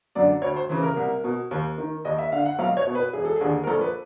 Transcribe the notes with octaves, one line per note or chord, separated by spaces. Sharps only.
F#2 D3 D5
D2 C#5
C5
C#3 E3
A#4
C2
B2
D#2
D#3
D#2 D#5
E5
D3 F5
F#5
B1 F5
C#5
B2
B4
E1 G#4
A4
G#4
D#2 D3
A#4
A#1 A4
B4